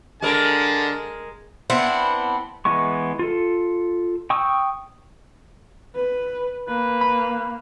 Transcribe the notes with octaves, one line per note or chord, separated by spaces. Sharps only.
D3 G#3 A#4 A5
B3 C4 D4 E4
E3 G#3 B3 C#6
F4 A4
G5 C#6 D#6 E6
B4
A#3 B4
B5